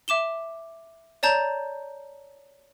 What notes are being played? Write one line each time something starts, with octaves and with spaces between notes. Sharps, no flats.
E5 D6 E7 G7
C#5 D5 A5 A#5 G6